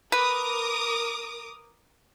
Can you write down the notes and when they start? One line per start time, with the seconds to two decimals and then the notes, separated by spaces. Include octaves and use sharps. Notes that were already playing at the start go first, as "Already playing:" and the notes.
0.12 A#4 B4 D6 D#6